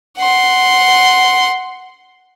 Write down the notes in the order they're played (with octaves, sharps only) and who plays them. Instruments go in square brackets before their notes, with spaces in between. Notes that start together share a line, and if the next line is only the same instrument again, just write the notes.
[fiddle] F#5 C6